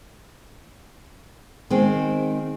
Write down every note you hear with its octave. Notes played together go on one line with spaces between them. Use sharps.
D#3 G#3 C4